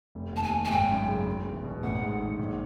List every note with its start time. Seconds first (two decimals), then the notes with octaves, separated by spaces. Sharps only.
0.15 F1
0.33 D#2 A5
0.43 G#5
0.53 D#3
0.65 G#5
0.71 G#1 G5
0.90 F#2
1.08 C#3
1.27 E1
1.45 E2
1.64 B2
1.83 A1 F#5
2.02 G#2
2.20 D#3
2.39 A#1